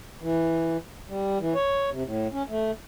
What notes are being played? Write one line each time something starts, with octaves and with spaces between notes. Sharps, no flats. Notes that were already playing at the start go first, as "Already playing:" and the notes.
E3
G3
E3
C#5
C3
A2
C#4
A3